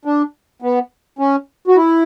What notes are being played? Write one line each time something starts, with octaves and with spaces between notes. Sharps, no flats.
D4
B3
C#4
F#4
E4